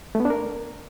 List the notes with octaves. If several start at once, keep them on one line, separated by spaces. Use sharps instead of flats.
A3
B3
D4
A#4